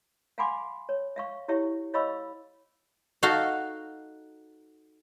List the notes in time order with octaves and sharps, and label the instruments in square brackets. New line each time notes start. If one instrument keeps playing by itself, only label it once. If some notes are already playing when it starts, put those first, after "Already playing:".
[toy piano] F5 F#5 G#5 B5 C6 D6
C#5
E5 F5 C#6
E4 G4 C#5 E5 C#6
C#5 D#5 F5 B5 C#6 E6
[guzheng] D#4 F#4 A4 F5